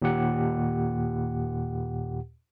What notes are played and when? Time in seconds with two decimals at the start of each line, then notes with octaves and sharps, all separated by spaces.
0.02 D#2 A#2 G4 F#5